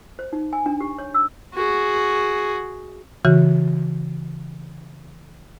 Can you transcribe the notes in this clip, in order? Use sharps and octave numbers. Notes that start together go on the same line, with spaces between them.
C5
D#4
G#5
D4
G4
C#5
E6
F#4 G#4
C#3 E3 F#4